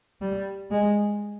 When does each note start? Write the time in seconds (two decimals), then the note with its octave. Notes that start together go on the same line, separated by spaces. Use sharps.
0.21 G3
0.71 G#3